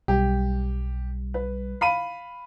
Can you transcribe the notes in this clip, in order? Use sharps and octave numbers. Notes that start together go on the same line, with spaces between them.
B1 G3 G4
B4
F5 B5 D#7